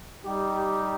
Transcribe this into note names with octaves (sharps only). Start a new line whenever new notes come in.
G3 D#4 G4